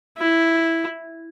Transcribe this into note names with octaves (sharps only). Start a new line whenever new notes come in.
E4